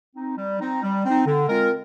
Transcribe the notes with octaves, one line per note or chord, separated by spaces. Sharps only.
C4 D#4
G3
C4 D#4
G3
C4 D#4
D3
G#3 C4 F4 A#4